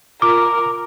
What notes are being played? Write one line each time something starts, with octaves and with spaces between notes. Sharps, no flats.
F4 A#4 D6